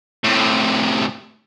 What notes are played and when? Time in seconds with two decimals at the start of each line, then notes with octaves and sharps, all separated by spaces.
0.24 A2 C3